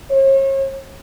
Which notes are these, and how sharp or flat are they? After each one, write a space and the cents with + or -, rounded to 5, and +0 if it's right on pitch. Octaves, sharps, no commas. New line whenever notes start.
C#5 -40